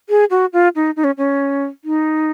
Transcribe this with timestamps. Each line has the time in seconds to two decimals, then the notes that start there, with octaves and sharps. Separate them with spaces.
0.09 G#4
0.30 F#4
0.53 F4
0.75 D#4
0.96 D#4
1.04 C#4
1.18 C#4
1.84 D#4